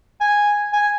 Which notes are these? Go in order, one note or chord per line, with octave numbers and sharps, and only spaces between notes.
G#5
G#5